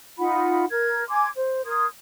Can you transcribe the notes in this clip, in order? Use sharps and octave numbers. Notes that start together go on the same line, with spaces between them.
D#4 F4 F#5 B5
A#4 G#6
G#5 C6 D6 G#6
C5
A#4 C6 D#6 G#6